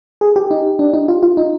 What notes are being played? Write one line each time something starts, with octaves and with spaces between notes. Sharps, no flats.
G#4
G4
D#4
D4
D#4
F4
F4
D#4